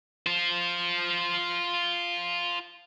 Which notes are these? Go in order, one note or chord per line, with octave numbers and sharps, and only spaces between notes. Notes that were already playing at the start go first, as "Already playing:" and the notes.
F4 C5